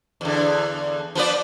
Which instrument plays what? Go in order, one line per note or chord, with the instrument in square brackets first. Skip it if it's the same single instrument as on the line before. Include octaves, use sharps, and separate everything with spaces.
[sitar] E2 D3
F3 B3 D5